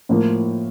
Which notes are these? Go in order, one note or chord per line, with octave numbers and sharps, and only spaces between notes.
A2 F3 A#3